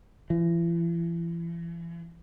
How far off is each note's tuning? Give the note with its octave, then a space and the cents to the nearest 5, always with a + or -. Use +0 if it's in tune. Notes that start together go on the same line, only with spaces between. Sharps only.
E3 +40